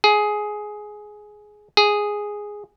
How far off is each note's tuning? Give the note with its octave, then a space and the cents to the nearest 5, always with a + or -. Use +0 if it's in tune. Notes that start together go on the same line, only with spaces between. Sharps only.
G#4 +10
G#4 -5